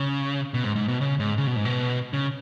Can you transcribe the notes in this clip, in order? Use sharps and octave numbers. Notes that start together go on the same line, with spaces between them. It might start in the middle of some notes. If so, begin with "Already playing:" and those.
Already playing: C#3
B2
G#2
G#2
B2
C#3
G#2
C#3
B2
G#2
B2
C#3